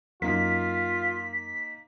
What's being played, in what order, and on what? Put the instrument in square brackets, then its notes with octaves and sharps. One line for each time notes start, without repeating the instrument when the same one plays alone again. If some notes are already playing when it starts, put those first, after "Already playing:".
[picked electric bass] F#2 [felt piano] A#3 D#4 [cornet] F4 [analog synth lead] B6